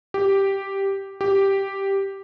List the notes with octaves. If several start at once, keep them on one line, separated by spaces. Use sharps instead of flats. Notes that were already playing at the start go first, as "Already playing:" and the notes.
G4
G4